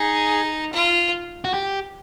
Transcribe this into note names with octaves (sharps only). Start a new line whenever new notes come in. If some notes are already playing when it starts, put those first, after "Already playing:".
Already playing: D#4 G#4
F4
F#4
G4